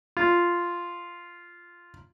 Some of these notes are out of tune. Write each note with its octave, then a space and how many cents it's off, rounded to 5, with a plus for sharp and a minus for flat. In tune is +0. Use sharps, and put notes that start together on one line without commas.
F4 -5